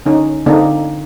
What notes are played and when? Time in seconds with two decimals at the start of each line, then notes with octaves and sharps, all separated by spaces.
0.06 D3 C#4 D#4
0.46 D3 A#3 C4 D4 D#4